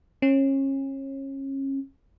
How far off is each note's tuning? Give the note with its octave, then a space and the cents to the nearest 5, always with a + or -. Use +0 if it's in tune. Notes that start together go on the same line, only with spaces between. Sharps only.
C#4 -30